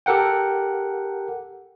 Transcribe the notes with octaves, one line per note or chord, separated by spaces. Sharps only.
G4 A4 A#4 F#5 G5